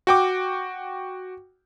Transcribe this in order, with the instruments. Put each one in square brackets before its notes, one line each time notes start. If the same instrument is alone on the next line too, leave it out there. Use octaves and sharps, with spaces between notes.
[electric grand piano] F#4 G5 D6